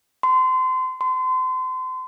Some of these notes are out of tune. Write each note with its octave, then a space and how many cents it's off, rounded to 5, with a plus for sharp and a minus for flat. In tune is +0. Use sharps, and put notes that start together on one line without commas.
C6 -30
C6 -35